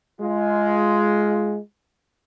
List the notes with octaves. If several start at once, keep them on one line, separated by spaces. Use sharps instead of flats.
G#3 F4